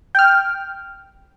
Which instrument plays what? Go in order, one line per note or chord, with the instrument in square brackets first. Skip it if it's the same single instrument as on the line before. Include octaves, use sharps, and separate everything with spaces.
[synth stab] G5 F6